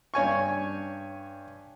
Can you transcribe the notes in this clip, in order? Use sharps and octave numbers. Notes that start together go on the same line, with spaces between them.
G2 C#5 G#5 C#6